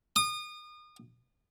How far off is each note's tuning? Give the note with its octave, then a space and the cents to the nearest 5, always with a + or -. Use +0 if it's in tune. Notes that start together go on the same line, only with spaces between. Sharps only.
D#6 -35